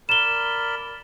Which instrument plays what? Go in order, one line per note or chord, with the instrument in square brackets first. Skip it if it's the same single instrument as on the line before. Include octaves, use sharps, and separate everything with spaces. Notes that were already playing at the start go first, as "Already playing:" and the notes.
[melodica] A#4 D5 B5 [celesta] E7 G7